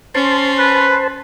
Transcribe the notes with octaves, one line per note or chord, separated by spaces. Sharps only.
C#4 C5 A5 C6
B4